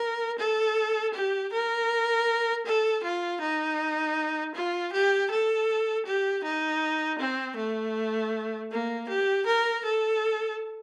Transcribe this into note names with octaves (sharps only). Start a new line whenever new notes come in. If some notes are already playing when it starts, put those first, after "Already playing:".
Already playing: A#4
A4
G4
A#4
A4
F4
D#4
F4
G4
A4
G4
D#4
C4
A3
A#3
G4
A#4
A4